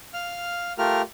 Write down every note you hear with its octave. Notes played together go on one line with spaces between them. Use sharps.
F5 F6
A3 F4 G4 A#4 F6